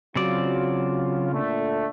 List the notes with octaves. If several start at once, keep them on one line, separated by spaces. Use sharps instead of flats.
C#3 F#3 C4 F4 D5
A#2 D3 A3